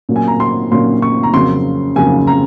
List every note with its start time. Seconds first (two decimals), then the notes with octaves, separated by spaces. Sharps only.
0.09 A#2 F#3 A#3 C#4
0.16 G#5
0.28 A#5
0.40 C6
0.71 A#2 F#3 A#3 C#4 C6
1.02 C#6
1.23 A#5
1.33 F2 C#3 F#3 A#3 C6
1.96 F2 C#3 F#3 A#3 G#5
2.27 A#5